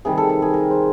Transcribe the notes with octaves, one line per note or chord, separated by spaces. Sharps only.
C3 D#3 G3 G#4
A4
A4
G#4
A#4
C5